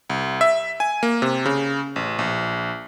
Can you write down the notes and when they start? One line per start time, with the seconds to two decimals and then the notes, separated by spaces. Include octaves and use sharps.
0.10 C2
0.41 E5
0.80 G#5
1.03 A#3
1.22 C3
1.45 C#3
1.96 A1
2.19 A#1